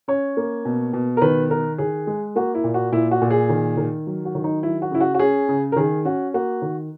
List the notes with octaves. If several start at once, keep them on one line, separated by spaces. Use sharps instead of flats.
C#4 C#5
A#3
B2
B2
A#4
D#3 B4
D#3 A#4
D#3 G#4
G#3
A#3 F#4
E4
A#2
F#4
A#2 E4
F#4
A#2
G#4
D#3
D#3
F#3
F#4
D#3
D#4
F#3 E4
F#4
C#3 E4
F#4
F#4
C#4 G#4
C#3
A#4
D#3 G#4
C#4 F#4
A#3 F#4
D#3